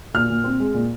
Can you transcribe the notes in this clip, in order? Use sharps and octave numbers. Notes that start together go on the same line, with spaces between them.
A#2 F6
A#2
C4
G#3
A#2